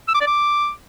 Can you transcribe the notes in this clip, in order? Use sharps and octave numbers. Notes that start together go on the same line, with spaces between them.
E6
D6
D5
D6